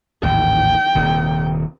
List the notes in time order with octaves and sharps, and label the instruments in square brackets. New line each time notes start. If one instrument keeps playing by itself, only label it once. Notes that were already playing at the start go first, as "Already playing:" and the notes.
[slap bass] A1 D#2 G#2 [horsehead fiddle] G5
[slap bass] D#1 D#2 C3